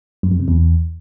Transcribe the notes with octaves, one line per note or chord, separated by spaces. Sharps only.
F#2
F2
C3
E2